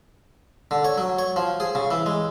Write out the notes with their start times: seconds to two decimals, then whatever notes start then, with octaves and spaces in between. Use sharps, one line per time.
0.71 D3
0.85 C#5
0.98 F#3
1.19 C#5
1.36 F3
1.60 G#4
1.75 C#3
1.91 E3
2.06 G#3